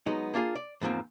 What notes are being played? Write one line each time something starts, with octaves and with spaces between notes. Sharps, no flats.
F#3 G#3 B3 D#4
A#3 D4 F4 G#4
D5
E2 G#2 F3 A#3 C4